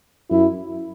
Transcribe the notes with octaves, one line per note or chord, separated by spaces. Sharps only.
F#2 E4